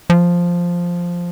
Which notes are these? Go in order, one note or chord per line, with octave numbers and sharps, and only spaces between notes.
F3